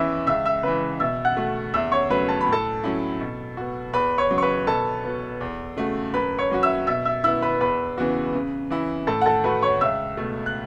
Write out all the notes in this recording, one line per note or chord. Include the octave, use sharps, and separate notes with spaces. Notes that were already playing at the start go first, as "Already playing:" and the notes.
Already playing: E2 E3 C#4 E4 E5 E6
C#2 E5 E6
E5 E6
C#3 E3 B4 B5
B2 E5 E6
F#5 F#6
A3 F#4
E2 E5 E6
C#5 C#6
C#3 F#3 A3 B4 B5
A5
B5
A2
A4 A5
F#3 C#4 E4
B2
B3 F#4
E2 B4 B5
C#5 C#6
C#3 F#3
C#6
B4 B5
B2 A4 A5
B3 F#4
E2
C#3 A3 F#4
F#2 B4 B5
C#5 C#6
F#3 C#4 F#4
E5 E6
B2 E5 E6
E5 E6
B3 E4 E5 E6
B4 B5
E2 B4 B5
C#3 E3 B3 F#4
C#3
E3 C#4 E4
A2 A4 A5
F#5
A4 A5
A3 F#4 B4 B5
C#5 C#6
C#2 E5 E6
B2 A3
F#6